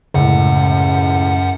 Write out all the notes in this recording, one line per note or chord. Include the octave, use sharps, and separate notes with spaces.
C#2 F#2 A2 F#5